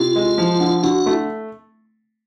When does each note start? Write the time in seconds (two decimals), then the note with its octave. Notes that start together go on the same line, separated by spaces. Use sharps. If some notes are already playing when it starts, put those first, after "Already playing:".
Already playing: C3 F4
0.16 G#3
0.38 F3
0.60 D3
0.83 D3 F#4
1.06 A3